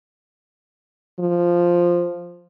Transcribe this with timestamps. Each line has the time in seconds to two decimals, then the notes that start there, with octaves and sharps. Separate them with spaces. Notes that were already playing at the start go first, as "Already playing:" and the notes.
1.20 F3